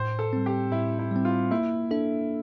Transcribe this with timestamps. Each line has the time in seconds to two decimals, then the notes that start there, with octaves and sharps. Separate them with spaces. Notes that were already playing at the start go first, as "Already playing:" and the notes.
Already playing: A2 C5
0.19 A4
0.33 G3 C4
0.46 G4
0.71 A2 E4
0.99 E4
1.11 G3 C4
1.25 F4
1.51 A#3 E4
1.91 D4 A4 E5